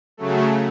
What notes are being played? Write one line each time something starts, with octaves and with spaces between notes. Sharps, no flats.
C#3 F#3 A3